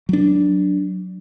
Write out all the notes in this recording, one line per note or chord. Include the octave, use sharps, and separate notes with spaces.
F#3 D4